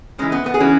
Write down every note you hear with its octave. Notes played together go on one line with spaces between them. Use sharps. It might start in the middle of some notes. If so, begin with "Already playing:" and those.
G#2 E3 G#3 C#4
B3
B3
G#4
E3 C#4 F#4